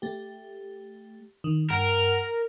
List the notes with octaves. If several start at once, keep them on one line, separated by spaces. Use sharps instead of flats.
A3 G4
D#3
G2 A#4 F#5